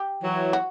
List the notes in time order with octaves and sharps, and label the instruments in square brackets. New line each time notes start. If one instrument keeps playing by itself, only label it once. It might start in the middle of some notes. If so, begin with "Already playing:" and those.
Already playing: [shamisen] G4
[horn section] E3 F#3
[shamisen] F#4